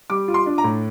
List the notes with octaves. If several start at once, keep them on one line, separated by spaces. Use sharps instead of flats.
G3 D6
F4
C6
D4
A#5
A2